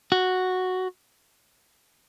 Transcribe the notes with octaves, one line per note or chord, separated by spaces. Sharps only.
F#4